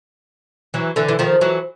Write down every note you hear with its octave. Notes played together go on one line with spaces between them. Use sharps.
E3 F#3
D3 E3
E3
D#3 F3
E3 F#3